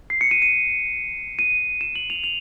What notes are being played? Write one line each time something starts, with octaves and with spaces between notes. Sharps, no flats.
C7
C#7
D#7
D#7
D#7
E7
F#7
F7
F7